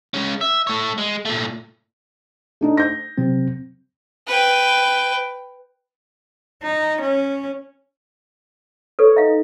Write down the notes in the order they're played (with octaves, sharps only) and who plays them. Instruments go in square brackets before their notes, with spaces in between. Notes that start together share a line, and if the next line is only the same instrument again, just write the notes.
[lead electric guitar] G#3 C#4
E5
A3 C#5
G#3
A#2 A3
[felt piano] A3 D4 D#4
G6 A#6
[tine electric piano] C3 F#3 C4
[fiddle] B4 G5
[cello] D#4
C#4
[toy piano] A4 B4 [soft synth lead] C#5
[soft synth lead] D#4 [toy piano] E5 F5